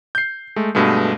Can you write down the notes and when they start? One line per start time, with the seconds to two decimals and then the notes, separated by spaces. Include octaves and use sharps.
0.15 G6 C7
0.56 G#3 A3
0.75 G2 B2 G#3 A3